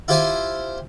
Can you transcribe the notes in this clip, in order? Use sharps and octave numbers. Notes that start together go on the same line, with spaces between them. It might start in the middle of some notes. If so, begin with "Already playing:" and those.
E4 F4 G4 C5 G#5